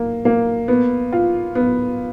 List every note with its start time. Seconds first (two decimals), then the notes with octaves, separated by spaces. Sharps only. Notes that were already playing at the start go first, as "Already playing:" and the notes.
Already playing: A#3
0.25 A#3
0.68 B3
1.13 F4
1.55 B3